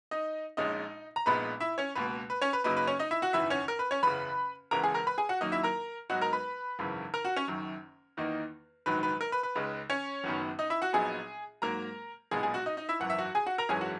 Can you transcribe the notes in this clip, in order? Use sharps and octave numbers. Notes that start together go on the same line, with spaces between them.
D#4 D#5
A#1 A#2 G#3 C#4 D#4 D#5
A#5
A#1 A#2 G#3 B3 D#4 B4 B5
E4 E5
C#4 C#5
C#2 B2 A#3 B4
B4
C#4 C#5
B4
F#2 C#3 F#3 A#3 D#4 B4
B4
C#4 C#5
D#4 D#5
E4 E5
F#4 F#5
F#1 E2 D#3 E4 E5
C#4 C#5
A#4
B4
C#4 C#5
F#1 E2 C#3 B4 B5
E1 E2 C#3 E3 G#3 A#4 A#5
G#4 G#5
A#4 A#5
B4 B5
G#4 G#5
F#4 F#5
F#2 D#3 F#3 A#3 D#4 D#5
E4 E5
A#4 A#5
G#2 F#3 B3 D#4 F#4 F#5
A#4 A#5
B4 B5
G#1 F#2 C#3 E3
A#4 A#5
F#4 F#5
C#4 C#5
F#1 F#2 D#3
E2 D#3 A#3 D#4
A#1 G#2 D#3 F#3 B4
B4
A#4
B4
B4
C#2 C#3 G#3 D#4
C#4 C#5
F#1 F#2 D#3 F#3 B3
D#4 D#5
E4 E5
F#4 F#5
A#1 A#2 F#3 B3 D#4 G#4 G#5
G#2 F#3 A#3 A#4 A#5
B1 A#2 G#3 B3 D#4 G#4 G#5
G#4 G#5
F#4 F#5
D#4 D#5
D#4 D#5
E4 E5
G#1 F#2 E3 F#5
E5
F#4 F#5
G#4 G#5
F#4 F#5
A#4 A#5
G#1 F#2 E3 G#3 C#4 G#4 G#5
F#4 F#5